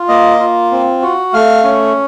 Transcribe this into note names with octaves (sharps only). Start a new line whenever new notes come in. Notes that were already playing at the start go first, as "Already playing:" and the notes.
Already playing: F4
A#3 D#5
F4
C4
F#4
A3 F5
C#4